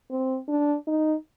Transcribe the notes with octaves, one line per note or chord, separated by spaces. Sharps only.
C4
D4
D#4